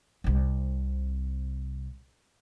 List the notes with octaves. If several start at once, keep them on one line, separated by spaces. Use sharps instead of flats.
C2 C3